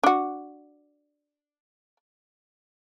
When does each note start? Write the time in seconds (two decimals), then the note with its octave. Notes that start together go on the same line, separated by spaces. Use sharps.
0.03 D4 F#4